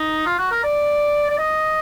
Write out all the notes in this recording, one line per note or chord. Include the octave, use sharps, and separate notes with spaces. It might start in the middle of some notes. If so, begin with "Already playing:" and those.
Already playing: D#4
F4
F#4
A#4
D5
D5
D#5